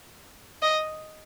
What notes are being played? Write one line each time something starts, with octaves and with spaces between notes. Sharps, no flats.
D#5